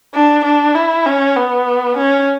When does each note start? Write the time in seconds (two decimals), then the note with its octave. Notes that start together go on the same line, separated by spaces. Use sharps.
0.14 D4
0.45 D4
0.75 E4
1.06 C#4
1.36 B3
1.97 C#4